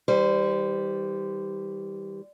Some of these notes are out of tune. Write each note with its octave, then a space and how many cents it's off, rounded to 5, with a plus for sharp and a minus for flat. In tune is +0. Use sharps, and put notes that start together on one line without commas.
E3 -45 G3 +0 C5 -25